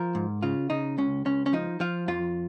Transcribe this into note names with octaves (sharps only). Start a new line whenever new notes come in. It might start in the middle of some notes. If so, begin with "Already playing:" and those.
Already playing: F3 A#4
G#2
C#3 F4
C#3 D#4
C#2 C#4
C#2 C#4
C#4
F3 D#4
F3 F4
F2 F4